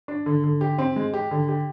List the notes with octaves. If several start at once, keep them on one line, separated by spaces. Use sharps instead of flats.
D4
D3
D3
G4
C4
G#3
G4
D3
G4